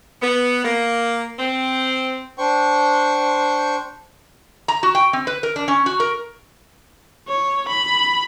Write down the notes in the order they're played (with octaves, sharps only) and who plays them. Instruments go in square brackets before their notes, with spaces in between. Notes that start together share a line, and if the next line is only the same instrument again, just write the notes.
[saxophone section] B3
A#3
C4
[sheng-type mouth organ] D4 C5 G5 C#6
[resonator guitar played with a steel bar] A#5
F#4
G5
C4
B4
A#4
D4
C#4
F#4
A#4
[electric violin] C#5
B5